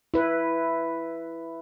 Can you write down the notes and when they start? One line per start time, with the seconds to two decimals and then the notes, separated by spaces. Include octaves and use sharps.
0.14 E4 B4